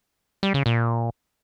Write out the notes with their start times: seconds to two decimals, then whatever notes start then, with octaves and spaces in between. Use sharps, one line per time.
0.43 G3
0.54 C#3
0.66 A#2